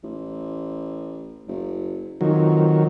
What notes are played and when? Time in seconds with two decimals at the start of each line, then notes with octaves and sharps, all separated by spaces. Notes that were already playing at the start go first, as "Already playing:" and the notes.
0.03 A1
1.48 F#1
2.21 F2 D#3 F#3